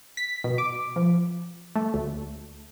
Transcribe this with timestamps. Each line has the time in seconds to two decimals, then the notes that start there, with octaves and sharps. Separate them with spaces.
0.17 B6
0.44 B2
0.58 D6
0.96 F3
1.76 A3
1.94 D2